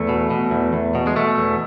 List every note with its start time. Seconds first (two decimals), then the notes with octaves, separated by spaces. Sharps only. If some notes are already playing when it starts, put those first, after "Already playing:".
Already playing: E2 A3
0.09 B2
0.30 B2
0.51 E2
0.73 E2
0.95 B2
1.07 G#3
1.16 B2 A3
1.38 E2